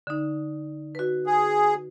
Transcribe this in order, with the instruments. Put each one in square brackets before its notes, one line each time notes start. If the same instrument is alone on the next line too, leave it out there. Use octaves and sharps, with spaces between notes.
[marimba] D3 D#4
F#4 B4
[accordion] G#4